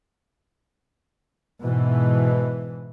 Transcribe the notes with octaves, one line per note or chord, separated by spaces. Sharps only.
G#2 B2 E3